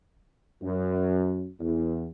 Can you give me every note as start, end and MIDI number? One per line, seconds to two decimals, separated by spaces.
0.62 1.47 42
1.60 2.08 40